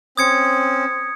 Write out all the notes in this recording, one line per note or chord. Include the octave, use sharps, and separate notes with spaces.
C4 C#4 D#6 G#6 C#7